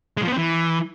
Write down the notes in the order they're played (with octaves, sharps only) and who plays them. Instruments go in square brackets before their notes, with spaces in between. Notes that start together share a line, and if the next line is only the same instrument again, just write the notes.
[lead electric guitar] G#3
F3
B3
C4
E3